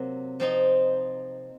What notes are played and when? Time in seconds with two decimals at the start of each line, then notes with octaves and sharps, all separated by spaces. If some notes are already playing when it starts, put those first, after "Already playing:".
Already playing: C3 F#3 A#3
0.40 F3 C4 D#4